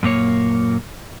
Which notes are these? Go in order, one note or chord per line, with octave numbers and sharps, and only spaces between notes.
F#2 A#2 A#3 C#5